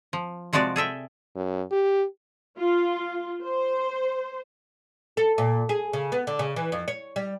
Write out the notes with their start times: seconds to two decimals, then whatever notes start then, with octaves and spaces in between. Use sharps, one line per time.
0.13 F3
0.53 C3 F3 G#3 F#4 D5
0.76 G#4 A4 E5 G5
1.36 F#2
1.71 G4
2.58 F4
3.43 C5
5.17 A4
5.38 A#2
5.69 G#4
5.93 C#3
6.12 B3
6.27 D3
6.39 C#3
6.56 E3
6.72 F2
6.88 C#5
7.16 G3